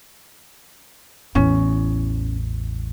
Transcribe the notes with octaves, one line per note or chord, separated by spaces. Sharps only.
A1 E2 C#4